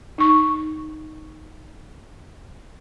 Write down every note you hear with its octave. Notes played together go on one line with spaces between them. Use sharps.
D#4 C#6